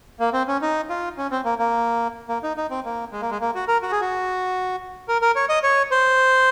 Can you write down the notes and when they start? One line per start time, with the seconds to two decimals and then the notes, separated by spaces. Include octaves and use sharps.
0.20 A#3
0.33 C4
0.48 C#4
0.62 D#4
0.89 F4
1.17 C#4
1.31 C4
1.45 A#3
1.59 A#3
2.29 A#3
2.43 D#4
2.57 D#4
2.70 C4
2.85 A#3
3.12 G#3
3.21 A#3
3.31 G#3
3.41 A#3
3.55 F#4
3.68 A#4
3.82 F#4
3.92 G#4
4.01 F#4
5.08 A#4
5.22 A#4
5.36 C#5
5.49 D#5
5.63 C#5
5.91 C5